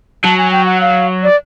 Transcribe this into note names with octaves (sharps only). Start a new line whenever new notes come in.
F#3 A5
G#5
G5
F#5
F5
D5